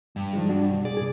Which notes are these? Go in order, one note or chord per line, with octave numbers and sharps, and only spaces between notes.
G2
D#3 F3 G#3
D4 F#4 D5
B1
G#4 D5
B2 G#4